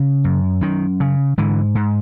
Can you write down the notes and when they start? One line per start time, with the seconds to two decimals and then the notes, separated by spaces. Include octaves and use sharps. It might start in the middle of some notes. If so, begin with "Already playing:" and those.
Already playing: C#3
0.24 F#2
0.61 F#2 D#3
1.00 C#3
1.38 G#2 D3 E3
1.75 G#2